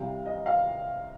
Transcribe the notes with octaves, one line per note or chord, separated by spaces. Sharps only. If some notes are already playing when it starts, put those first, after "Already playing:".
Already playing: C2 C3 G3 F5
D#5
F5